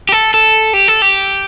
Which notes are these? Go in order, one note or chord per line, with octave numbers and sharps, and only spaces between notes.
G4
A4
A4
G4
A4
G4